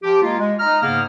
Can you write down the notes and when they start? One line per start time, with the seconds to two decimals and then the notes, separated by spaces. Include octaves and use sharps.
0.03 F3 G4
0.23 G#3 A#3 F4
0.39 G#3
0.60 D#4 D#5 A#5 F6
0.83 G#2 C#3 A#3 B3 F6